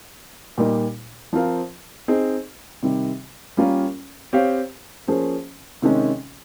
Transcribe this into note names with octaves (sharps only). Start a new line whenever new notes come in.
A#2 G3 A#3 D#4
F3 C4 F4 A#4 F5
C4 D#4 G#4
C3 D#3 G3
G3 A#3 C#4 F4 A#4
C4 G4 C#5 F5
F3 A#3 C#4 G#4 C5
C3 D#3 G#3 C#4